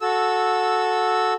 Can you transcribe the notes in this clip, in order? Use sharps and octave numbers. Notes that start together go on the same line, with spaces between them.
F#4 A4 E6